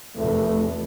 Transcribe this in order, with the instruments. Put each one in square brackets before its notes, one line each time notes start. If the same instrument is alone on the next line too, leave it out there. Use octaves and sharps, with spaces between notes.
[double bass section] F1 E2 [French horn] A3